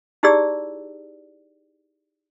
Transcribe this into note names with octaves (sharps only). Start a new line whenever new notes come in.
D#4 E4 G4 G#4 D5 E6